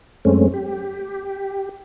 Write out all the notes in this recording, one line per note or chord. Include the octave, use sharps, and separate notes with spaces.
F#2 G#3 A3 C4 C#4
G4